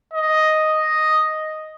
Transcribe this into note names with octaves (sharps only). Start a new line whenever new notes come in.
D#5